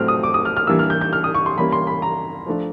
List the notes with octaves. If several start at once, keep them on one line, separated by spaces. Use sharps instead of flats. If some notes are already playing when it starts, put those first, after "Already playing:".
Already playing: A2 F#3 A3 C4 F6
D#6
D6
D#6
F6
F6
E3 G3 A#3 D4 E6
F6
G6
G6
F6
D#6
C#6
C6
E3 G3 A#3 C#4 B5
C6
B5
A#5
F3 A3 D4